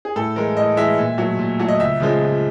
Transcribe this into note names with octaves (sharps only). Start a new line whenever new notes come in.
G#4
A2 A4
E3 G#3 A#4
A2 D#5
E3 G#3 E5
A#2
F#3 A3
A#2
F#3 A3
D#5
C#2 E5
C#3 F3 G#3
C#2